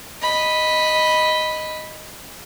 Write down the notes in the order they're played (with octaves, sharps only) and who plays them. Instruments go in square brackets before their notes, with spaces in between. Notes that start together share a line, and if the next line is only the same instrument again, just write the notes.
[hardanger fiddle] D#5 B5